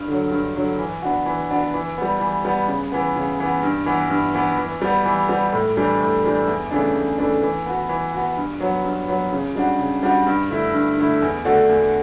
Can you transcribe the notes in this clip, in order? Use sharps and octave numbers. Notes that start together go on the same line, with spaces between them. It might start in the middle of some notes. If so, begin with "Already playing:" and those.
Already playing: G2
D3 F#3
G2
D3 F#3
E3
B3 D4 F#4
E3
B3 D4 F#4
E3
G3 B3
E3
G3 B3
C#3
E3 B3
C#3
E3 B3
G2
E3 B3
G2
E3 B3
E3
G3 B3
E3
G3 B3
A2
E3 G3 D4
A2
E3 G3 D4
E2
C#3 E3 A3 D4
E2
C#3 E3 A3 D4
E3
B3 F#4
E3
B3 F#4
G2
F#3 B3
G2
F#3 B3
C#3
G3 D4 F#4
C#3
G3 D4 F#4
G2
D3 A3 E4
G2
D3 A3 E4
E2
D3 A3 D4 F#4
E2